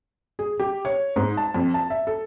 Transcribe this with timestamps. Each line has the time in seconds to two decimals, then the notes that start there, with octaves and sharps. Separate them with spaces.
0.39 G#4
0.60 G4
0.85 C#5
1.16 G#2
1.37 A5
1.54 F2
1.74 A5
1.90 E5
2.07 A4